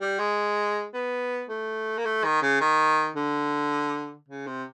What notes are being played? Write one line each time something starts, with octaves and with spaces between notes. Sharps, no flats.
G3
G#3
B3
A3
A#3
A3
D#3
C#3
D#3
D3
C#3
C3